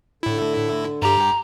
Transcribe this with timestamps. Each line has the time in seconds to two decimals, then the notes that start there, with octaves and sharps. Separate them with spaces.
0.23 A2 D3 E4
1.02 G2 G4 A#5